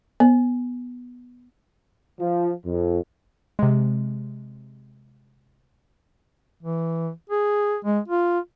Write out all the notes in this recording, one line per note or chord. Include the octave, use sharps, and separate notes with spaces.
B3
F3
F2
C3 G#3
E3
G#4
G#3
F4